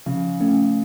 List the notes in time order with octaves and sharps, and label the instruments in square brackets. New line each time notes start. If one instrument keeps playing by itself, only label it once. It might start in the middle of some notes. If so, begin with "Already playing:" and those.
[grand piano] C#3 [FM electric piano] F3
[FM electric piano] A3 C#4